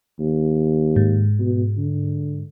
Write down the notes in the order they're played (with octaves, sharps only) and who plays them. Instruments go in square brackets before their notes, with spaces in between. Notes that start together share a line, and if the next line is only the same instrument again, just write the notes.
[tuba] D#2
[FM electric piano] G#2
[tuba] B2
D3